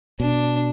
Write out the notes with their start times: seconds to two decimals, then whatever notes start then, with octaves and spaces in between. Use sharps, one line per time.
0.20 B2 D4